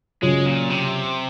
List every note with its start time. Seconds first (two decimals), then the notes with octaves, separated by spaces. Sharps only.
0.22 C#3 F#3 G#3 C#4 F4
0.46 A#2
0.70 C3